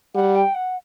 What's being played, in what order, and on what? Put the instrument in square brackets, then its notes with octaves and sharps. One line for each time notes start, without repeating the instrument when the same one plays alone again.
[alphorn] G3 [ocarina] F#5
[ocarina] G5
F#5